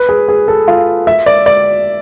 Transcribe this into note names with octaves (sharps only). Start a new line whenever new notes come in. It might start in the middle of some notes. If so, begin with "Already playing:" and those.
Already playing: B4
G#4
G#4
A4
F4
E5
D5
D5